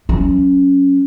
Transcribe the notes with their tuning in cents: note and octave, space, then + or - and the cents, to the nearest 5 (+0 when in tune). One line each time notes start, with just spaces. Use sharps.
F#3 +0 C#4 +0